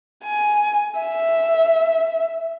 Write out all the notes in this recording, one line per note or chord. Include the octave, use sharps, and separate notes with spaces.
G#5
E5